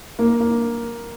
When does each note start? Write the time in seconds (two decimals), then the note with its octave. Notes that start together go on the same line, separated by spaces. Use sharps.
0.19 A#3
0.40 A#3